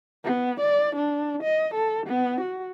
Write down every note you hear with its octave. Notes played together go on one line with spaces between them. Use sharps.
B3
D5
D4
D#5
A4
B3
F#4